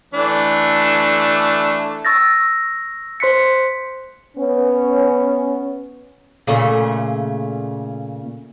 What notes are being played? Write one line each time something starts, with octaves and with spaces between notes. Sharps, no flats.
E3 A3 D4
C#6 E6 A6 A#6
C5 C6 F#6 B6 C#7
B3 C#4
A#2 C#3 A3